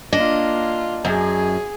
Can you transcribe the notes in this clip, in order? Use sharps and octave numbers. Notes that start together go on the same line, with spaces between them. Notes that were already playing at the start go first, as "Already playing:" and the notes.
A#3 D4 F4 D#5
F#2 G#4